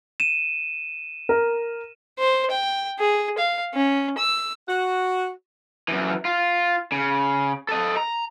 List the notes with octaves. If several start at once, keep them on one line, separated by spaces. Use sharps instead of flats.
D#7 E7
A#4
C5
G5
G#4
F5
C#4
E6
F#4
F#2 E3
F4
C#3
A4 D#5
A#5